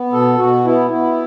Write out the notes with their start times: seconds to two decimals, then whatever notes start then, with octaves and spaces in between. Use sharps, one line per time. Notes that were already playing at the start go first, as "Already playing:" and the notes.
Already playing: B3
0.12 B2 A4
0.38 B2 F#4
0.65 B3 E4
0.91 B3 E4